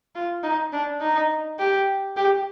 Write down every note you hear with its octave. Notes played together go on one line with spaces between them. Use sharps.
F4
D#4
D4
D#4
G4
G4